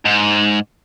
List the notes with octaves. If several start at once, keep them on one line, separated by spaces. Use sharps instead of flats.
G#2